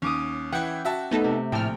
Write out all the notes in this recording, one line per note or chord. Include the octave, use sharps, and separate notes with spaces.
D#2 C#4 D6 D#6
E3 E4 F#5 G5
F#4 E5 A5
A3 B3 D#4 A4
C3
A#1 A2 G5 A5 F6